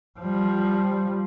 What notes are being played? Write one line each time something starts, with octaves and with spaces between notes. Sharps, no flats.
F3 G3